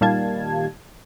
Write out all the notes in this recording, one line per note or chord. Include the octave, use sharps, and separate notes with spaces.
A#2 D#3 G3 F5 A5 G#6